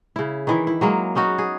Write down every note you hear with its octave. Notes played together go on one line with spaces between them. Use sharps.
C#3 E4
D#3 E3 E4
E4
F#3 G#3 A#3
B3 C#4 D#4 F#4
G#4